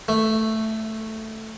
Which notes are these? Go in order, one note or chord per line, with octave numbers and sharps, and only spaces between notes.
A3